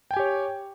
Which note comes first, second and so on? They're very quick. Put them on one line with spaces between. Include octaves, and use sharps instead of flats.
G5 G#5 G4 C#5